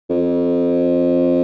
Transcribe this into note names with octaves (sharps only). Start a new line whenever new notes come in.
F2